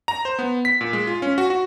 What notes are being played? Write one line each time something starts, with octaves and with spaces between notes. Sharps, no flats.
A#5
C5
B3
B6
A#2
G#3
F4
C#4
F#4
F#4